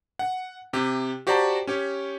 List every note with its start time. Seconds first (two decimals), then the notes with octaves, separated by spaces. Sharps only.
0.19 F#5
0.73 C3 G4
1.27 F#4 G4 C5 D5 A5 A#5
1.67 C#4 G4 C#5